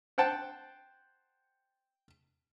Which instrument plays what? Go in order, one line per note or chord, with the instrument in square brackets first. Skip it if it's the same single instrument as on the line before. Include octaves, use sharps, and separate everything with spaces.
[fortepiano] C5 F#5 G5 A5